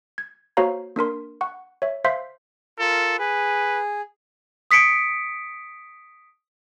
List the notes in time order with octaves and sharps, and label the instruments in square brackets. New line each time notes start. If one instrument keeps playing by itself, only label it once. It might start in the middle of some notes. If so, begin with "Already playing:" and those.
[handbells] G#6
A#3 F#4 C5 C#5 F5 A#5
A#3 D4 A#4 C6
F#5 C#6
C#5 E5
C5 E5 F5 C6 G6 B6
[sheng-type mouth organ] F4 A#4 [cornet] A4
[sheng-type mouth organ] G#4 [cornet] B4
[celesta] D#6 B6 C#7 D7